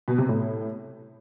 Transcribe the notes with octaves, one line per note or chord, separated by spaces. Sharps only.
B2
C3
A2